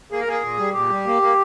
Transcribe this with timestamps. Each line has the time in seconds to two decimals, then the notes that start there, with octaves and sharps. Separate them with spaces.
0.11 A#3 G#4
0.20 A#4
0.27 A#3 G#4
0.42 A#2
0.58 G3
0.74 A#2 G4
0.90 G3
1.06 A#3
1.22 A#3